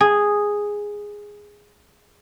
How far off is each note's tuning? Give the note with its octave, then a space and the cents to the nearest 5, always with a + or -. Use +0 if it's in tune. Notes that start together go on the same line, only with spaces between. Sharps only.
G#4 -5